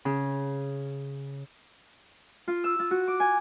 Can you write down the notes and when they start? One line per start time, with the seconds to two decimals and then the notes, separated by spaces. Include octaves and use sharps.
0.05 C#3
2.48 F4
2.64 E6
2.79 F4
2.91 F#4
3.08 D6
3.20 G#5